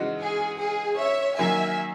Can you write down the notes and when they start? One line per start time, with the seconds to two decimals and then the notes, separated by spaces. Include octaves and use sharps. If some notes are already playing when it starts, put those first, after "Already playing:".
Already playing: C#3 E3 G#3 D#4 F#4
0.21 G#4
0.60 G#4
0.99 C#5 E5
1.38 D#3 F#3 A#3 E5 G#5